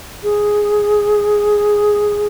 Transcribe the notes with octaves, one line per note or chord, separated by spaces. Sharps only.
G#4